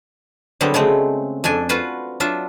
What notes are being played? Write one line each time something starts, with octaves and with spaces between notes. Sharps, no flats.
D3 F#3 G3 B3 C4
C#3 G#3 A3 C4
F2 D4 A4 G#5
F4 F#4 B4 C5
F#3 D4 F4 E5